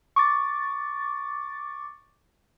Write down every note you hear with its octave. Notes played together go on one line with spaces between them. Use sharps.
C#6 D6 A6